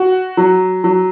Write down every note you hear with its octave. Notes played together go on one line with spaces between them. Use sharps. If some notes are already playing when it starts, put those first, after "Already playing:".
Already playing: F#4
F#3
F#3